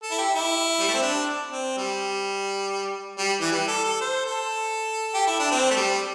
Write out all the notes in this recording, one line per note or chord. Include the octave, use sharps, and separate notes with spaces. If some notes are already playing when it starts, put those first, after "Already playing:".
A4
E4
G4
E4
G3
A3
C4
D4
C4
G3
G3
E3
G3
A4
A4
C5
A4
G4
E4
D4
C4
A3
G3